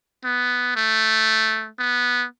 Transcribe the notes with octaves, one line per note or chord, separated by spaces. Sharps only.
B3
A3
B3